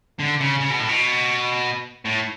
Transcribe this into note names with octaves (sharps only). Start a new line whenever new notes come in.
D3
C#3
C#3
B2
A2
B2
A2